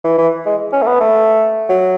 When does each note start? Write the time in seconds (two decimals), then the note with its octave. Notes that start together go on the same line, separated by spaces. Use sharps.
0.04 E3
0.18 E3
0.46 G#3
0.73 C#4
0.82 A3
0.87 B3
1.00 A3
1.69 F#3